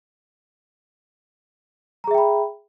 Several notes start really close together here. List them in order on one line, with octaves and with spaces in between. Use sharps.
A#5 G#4 E5 G5 B5